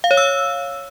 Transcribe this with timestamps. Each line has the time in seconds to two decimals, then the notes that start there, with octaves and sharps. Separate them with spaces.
0.04 F5
0.11 C#5
0.17 E6